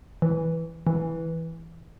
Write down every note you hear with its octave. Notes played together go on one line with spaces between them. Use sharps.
E3
E3